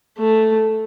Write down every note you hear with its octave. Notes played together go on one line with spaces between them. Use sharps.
A3